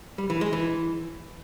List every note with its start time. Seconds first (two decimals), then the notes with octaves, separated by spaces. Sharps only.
0.18 G3
0.30 E3
0.41 G#3
0.53 E3